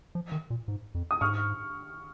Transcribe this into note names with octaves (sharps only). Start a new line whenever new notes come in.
F3
D#3
A#2
G#2
F2
D#6
G#2 C#6 F6